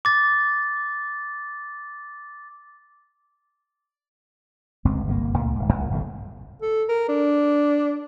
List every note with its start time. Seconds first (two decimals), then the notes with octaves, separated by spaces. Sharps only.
0.05 D6 A6
4.85 G1 C#2 G#2 C4
5.07 G1 C2 D3 A#3
5.38 C#2 A#2 A3
5.56 D1 G#2
5.71 C2 A#2
5.90 G1 C2 A2 D3
6.62 A4
6.89 A#4
7.09 D4